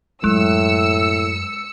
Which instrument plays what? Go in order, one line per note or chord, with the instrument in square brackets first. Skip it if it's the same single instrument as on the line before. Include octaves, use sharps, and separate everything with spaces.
[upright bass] F#2 [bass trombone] A2 [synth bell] G#3 [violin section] E6 C#7